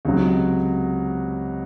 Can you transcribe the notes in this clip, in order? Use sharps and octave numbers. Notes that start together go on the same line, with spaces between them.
C#2 C3 F#3